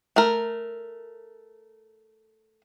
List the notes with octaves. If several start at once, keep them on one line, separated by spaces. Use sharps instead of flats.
A3 A#4